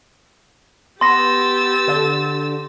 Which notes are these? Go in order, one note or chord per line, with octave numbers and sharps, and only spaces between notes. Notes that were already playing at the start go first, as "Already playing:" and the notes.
B3 G4 C6 E6 A6 A#6
D3